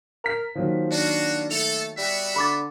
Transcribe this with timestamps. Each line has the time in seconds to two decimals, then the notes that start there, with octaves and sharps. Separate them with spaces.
0.25 A#4 F6 B6
0.55 D#3 F3 F#3 A#3
0.92 D4 F4 F#4
1.51 A3 A4 F7
1.98 G3 B3 F#4 E5
2.36 D3 B5 D6 A6